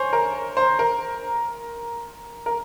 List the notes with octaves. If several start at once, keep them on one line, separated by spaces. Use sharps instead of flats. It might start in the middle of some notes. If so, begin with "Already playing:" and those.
Already playing: C5 C#5 G#5
A#4
C5
A#4
A#4